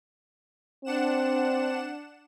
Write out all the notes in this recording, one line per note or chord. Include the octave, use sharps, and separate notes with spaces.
C4 D4 F#5 E7